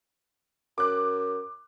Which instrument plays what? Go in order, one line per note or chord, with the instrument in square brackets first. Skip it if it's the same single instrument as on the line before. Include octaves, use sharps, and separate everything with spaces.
[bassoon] F#2 [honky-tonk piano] D6 F#6